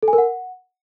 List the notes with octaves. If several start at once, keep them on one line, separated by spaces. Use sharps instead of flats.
A4
G#5
A#4
F#5